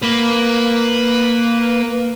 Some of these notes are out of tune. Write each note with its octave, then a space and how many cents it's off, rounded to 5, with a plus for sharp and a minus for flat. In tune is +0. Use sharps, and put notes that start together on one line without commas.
A#3 +0 B4 +0